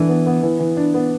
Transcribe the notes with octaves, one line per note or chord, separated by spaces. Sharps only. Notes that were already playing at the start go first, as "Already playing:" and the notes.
Already playing: E3 D4 A4
B3
B3
E3
E3
D4
B3